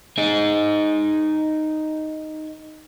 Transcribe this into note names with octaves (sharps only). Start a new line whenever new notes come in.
D#4 G#4